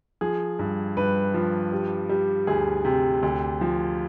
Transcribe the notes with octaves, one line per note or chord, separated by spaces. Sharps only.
F3 G#4
G2
G2 B4
F3
G3
G3
D2 G#4
C3
D2
F3